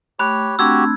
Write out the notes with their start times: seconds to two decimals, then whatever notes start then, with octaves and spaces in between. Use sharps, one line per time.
0.19 A3 G4 C#5 B5 F#6
0.59 A3 C4 D4 F#4 G4 E6 G#6